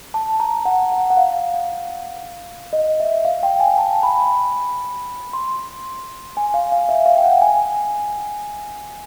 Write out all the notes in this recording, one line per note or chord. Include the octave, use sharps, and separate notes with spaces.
A5
A#5
F#5
F#5
F#5
F5
D#5
E5
F5
G5
G#5
A5
B5
C6
G#5
F5
F5
E5
F5
G5
F#5
G#5